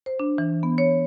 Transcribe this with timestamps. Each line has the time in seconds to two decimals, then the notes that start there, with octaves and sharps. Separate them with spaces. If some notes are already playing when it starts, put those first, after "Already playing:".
0.06 C5
0.20 D4
0.38 E3
0.63 B3
0.78 C#5